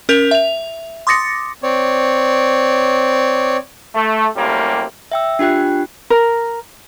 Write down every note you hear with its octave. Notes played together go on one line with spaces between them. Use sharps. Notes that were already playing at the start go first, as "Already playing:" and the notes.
C#4 A#4 G6 F7
E5 F7
C6 D6 D#6 A6 A#6 C#7
C4 C#5 D5
A3
F#2 A2 C3 G3 A#3
E5 G5 E6
D4 F4 G4 G5 F#6
A#4